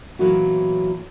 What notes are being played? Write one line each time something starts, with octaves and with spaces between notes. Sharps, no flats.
A#2 E3 F#3 B3 E4 F#4